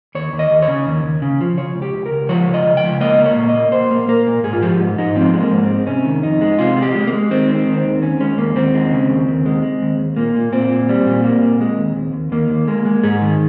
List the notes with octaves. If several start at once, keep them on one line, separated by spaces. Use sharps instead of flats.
D#2 C#5
D#2
D#5
D#2
C#5
C#3
D#2
D#2
C#3
F3
C#3 C#5
C#2
G4
C#2
A#4
C#2
F3 C#5
C#2
D#5
C#3
G5
C#2
A#3 D#5
A#3
C#5
A#2
D#5
A#3
A#2 C5
A#3
A#3 A#4
A#2
G#2 G#4
F4
F3 G4
G#2
G#2 D#4
F3 C4
G#3
A#3
G#2
C4
G#3
C3 C#4
D#3
F2 D#4
G#3
C3 F4
G#3
G4
G#3
A#3
G#3
D#3 C4
G#3
C4
D#3
C4
D#2
D#2 C#4
G#3 C#4
D#2 A#3
D#2 C4
G#3
C#3
D#2
D#2
G#3
G#3
D#2
D#2
A#2 A#3
A#2
A#2 C4
A#2
G3
A#2
A#3
A#2
G#3
D#2
D#2
D#2
D#2 A#3
D#2
G#3 A#3
G#3
G#2 G#4
D#3